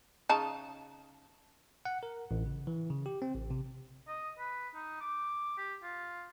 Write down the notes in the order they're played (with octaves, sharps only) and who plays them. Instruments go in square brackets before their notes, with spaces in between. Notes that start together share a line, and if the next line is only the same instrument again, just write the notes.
[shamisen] C#3 D#4 A5
[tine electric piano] F#5
A#4
A1
C#3
E3
C#3
G4
C4
A1
C3
[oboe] D#5
B4
D#4
D6
G4
F4